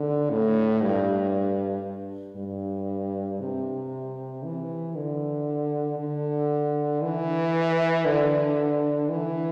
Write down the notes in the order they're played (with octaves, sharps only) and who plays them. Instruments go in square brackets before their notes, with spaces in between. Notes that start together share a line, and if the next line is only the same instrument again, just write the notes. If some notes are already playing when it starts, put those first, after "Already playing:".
Already playing: [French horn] D3
A2
G2
G2
C3
E3
D3
D3
E3
D3
E3